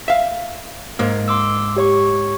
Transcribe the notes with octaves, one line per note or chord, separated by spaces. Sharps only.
E5 F5
G#2 A#3
C6 D6 E6
G4 C#5 C#6